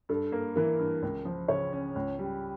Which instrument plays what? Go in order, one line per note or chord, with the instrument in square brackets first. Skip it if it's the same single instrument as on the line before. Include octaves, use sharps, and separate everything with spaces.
[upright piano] G2 [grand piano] A4
[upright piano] A#3
[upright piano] E3 [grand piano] A#4
[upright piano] G2
C#2
F3
[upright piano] C#3 [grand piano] C#5
[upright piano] C#4
C#2
G3